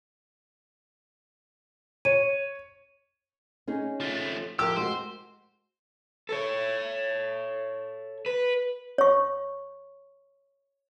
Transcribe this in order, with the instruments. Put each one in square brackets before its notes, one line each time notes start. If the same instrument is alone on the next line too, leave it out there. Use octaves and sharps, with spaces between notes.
[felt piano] C#5 [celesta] D#7
[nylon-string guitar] C#4 D#4 G#4
[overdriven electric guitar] F3 A3
[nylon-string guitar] F3 A#4 [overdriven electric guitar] G4 [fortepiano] E6
[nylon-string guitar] G#3 F#4 [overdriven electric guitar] C5
[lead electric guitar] A4 C#5
B4
[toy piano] C#5 C#6